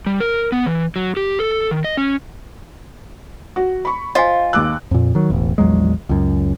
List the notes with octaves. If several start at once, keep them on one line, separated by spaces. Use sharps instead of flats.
G3
A#4
B3
E3
F#3
G4
A4
D#3
D#5
C#4
F#4
B5 C#6
F4 C5 D#5 F5 G#5
D#2 D6 E6 F#6
F2 A#2
D#3 F#3
E1 A1
A#1 E2 F#3 G#3
C#2 F#2